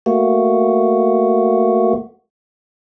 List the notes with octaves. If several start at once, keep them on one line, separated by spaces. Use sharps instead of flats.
A3 A#3 F#4